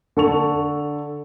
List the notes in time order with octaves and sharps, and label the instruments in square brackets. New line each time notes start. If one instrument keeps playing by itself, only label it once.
[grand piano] D3 A4 C#6 F7